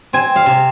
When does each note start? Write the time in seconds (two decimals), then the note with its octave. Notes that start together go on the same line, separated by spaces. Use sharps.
0.13 C4 G#5
0.36 F5
0.46 C3